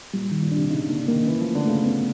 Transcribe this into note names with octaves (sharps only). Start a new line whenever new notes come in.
A#2 G3
A#2 D#3
A#2
C3 D4
C#3 D#4
D3 A#3
D#3 A#3
E3 C#4
F3
A3
D3
C#3 A3
B3